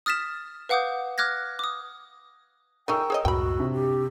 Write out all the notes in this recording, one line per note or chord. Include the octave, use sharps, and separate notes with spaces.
D#6 F6 A6 B6 E7
B4 F5 F#5 D6 D#6 G6
D6 F6 F#6 G#6 A#6
D6 D#6
A3 D#4 G#4 A#4 G5 C#6 E6
G#4 C#5 D#5
C#2 F#2 A2 F#4 G5 B5
C3 D4
G4